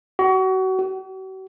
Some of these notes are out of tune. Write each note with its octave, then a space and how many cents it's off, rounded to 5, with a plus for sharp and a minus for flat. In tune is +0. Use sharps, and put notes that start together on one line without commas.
F#4 +30
F#4 +45